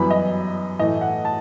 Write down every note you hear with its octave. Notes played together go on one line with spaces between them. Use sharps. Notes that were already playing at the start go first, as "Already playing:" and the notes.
Already playing: F#2 E3 G3 B3 B5
D#5
A2 E3 A3 D#5
F#5
A5